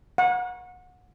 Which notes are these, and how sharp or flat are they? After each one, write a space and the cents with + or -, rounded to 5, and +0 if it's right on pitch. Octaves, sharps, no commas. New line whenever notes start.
F#5 -30